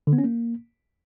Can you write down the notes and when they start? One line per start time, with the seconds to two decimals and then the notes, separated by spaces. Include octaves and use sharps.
0.07 D3
0.13 B3
0.18 C#4
0.24 A#3